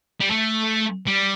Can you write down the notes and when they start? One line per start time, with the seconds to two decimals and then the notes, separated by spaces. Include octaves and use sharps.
0.20 G3
0.30 A3
1.07 G3